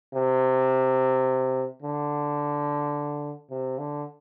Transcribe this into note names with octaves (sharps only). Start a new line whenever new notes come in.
C3
D3
C3
D3